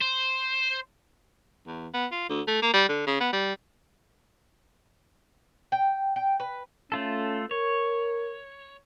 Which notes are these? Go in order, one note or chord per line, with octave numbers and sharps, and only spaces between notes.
C5
E2
B3
F4
D2
A3
A#3
G3
D3
C#3
B3
G3
G5
G5
B4
A3 C#4 F4 A4
A#4 C#5